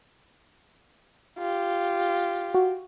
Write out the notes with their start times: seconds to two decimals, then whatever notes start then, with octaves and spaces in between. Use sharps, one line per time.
1.39 F4 G4
2.54 F#4